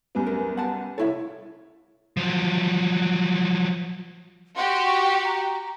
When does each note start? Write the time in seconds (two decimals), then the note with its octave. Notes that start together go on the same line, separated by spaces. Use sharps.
0.15 C2 F#2 B3
0.27 A#4
0.57 F#5 A5
0.98 C2 E4 A4 C#5 E5
2.17 F3 F#3
4.57 F#4 G4 C6
4.87 C#6
5.25 A#5